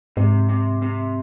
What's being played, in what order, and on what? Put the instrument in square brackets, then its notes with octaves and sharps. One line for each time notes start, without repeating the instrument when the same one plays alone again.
[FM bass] G#2 [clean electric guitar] C3
[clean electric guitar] C3
C3